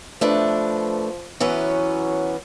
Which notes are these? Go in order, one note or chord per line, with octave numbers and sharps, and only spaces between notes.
F3 A3 D4 B4
E3 F#3 B3 C#4